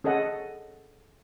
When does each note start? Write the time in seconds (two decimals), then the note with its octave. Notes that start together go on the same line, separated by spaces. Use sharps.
0.04 C#4 G#4 A4 D#5 F#5